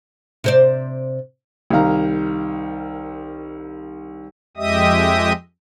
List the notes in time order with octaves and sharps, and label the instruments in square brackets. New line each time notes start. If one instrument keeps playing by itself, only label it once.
[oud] C3 C5 D5
[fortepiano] C2 D#3 F5 A#5
[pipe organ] F2 G#3 G4 D#5 E5 D#6